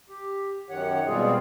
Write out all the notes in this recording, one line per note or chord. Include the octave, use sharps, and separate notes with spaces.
G4
F#2 D#3 C#5 F#5
B2 G3 G#3 C4 F4 G#4